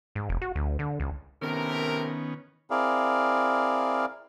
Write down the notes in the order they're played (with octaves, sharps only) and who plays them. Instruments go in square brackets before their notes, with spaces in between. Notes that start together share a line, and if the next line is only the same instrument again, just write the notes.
[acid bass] G#2
F1
F#4
D2
D3
C#2
[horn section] A2 C3 A#4 [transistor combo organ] D#3 B3 C#4
[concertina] C4 E4 G#4 A#4 D5 F5